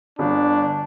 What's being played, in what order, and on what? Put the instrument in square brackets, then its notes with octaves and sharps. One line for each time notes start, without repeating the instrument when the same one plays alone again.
[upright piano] G1 [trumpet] D4